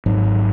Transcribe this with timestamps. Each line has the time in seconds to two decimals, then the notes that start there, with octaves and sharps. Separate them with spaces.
0.06 G#1 G#2 F#3